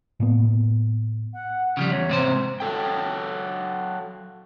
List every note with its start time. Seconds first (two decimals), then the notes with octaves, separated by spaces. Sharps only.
0.20 A2 A#3 B3
1.33 F#5
1.77 C#3 F3 G3
1.90 E2 C#5
2.09 G#2 C3 C5
2.60 F#3 A4 G5